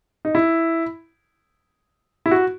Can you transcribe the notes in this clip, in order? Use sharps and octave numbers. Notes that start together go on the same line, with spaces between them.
D#4
E4
E4
F#4